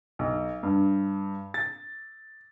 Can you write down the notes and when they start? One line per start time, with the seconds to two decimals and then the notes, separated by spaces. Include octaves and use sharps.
0.19 B1
0.63 G2
1.54 A6